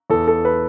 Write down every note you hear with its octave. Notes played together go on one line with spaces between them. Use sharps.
E2 A4
A4
B4